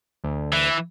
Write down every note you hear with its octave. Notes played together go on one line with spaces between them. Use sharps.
D2
E3